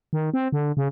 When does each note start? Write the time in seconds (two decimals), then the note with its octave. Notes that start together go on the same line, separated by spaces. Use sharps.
0.13 D#3
0.34 C4
0.52 D3
0.77 C#3